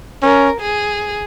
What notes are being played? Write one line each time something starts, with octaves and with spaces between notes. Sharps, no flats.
C#4 A#4
G#4